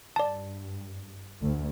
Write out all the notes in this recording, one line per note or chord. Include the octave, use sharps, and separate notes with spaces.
G2 D5 A5
D2